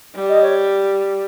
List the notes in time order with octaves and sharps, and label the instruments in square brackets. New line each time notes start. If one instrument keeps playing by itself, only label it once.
[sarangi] G3
[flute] D#5
C#5